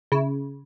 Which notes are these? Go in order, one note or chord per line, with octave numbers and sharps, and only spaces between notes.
C#3 E4